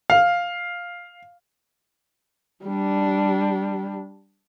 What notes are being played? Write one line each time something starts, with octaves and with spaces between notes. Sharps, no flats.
F5
G3 D4